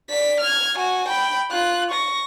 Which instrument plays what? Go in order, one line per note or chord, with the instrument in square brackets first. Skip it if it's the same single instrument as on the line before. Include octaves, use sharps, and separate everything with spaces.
[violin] D5 B6
F6 G#6
F#4 G#5
G5 B5
F4 F#6
C#6 A#6